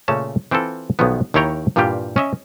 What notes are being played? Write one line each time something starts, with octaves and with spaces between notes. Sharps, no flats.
A#2 C#3 A3 C#4 A5
E3 C4 E4 F4 A4
B1 B2 D#3 F3 B3
D#2 D#3 E4 C#5 G5 A#5
G2 A#2 E3 G3 F4 G4
C#4 D#5 E5